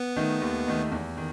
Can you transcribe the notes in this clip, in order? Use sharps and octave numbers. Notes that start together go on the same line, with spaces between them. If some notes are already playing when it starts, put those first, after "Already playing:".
Already playing: B3
D#3 A3 D#4
D#2
D#3 A3 D#4
E2
D#3